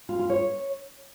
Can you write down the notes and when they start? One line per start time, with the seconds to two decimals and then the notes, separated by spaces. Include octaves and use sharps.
0.09 F4
0.19 F4
0.30 C#5